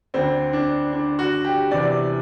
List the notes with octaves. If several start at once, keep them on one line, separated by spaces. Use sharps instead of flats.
D2 D3 C4
D4
D4
F#4
G4
E2 C3 E3 D5